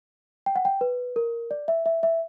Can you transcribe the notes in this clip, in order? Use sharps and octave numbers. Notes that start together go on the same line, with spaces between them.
G5
F#5
G5
B4
A#4
D5
E5
E5
E5